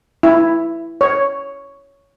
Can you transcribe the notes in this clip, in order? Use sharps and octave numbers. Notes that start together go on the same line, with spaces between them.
E4
C#5